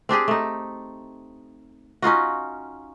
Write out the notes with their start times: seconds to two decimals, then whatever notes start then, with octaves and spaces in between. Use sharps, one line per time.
0.09 C4 D4 G4 G#4
0.28 A3 D#4
2.02 C#4 D#4 F4 F#4